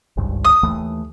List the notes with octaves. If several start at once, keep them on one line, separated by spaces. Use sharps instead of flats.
G#1 C#2 G2
D#6
D#2 E3 A3